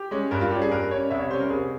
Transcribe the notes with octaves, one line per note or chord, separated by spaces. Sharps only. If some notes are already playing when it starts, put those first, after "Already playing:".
Already playing: G4
G#3 C#4
G2 A#4
F4
G3 C#4 G4
G#4
G2 A#4
G3 C#4 C#5
C2 E5
C#5
C3 G3 C#4 C5
A#4
C2 G#4